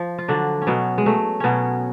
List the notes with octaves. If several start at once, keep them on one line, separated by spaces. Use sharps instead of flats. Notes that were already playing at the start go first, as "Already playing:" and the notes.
Already playing: F3
F4
D3 F#3 D4
C#4
B2 F#3 B3
G#3
F#3 A3
B2 F#3 B3 C#4